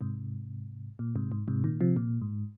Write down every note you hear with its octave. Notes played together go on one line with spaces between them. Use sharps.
G#2 C3
A#2
G#2 C3
G#2
G#2 C3
A#2 D#3
C3 F3
A#2
G#2